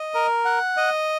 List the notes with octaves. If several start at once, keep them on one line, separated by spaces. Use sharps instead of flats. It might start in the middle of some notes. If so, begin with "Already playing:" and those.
Already playing: D#5
A#4
F#5
D#5